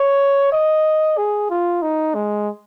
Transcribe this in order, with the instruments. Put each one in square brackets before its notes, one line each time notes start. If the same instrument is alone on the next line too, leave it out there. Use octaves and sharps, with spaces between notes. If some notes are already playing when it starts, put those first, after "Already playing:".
Already playing: [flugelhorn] C#5
D#5
G#4
F4
D#4
G#3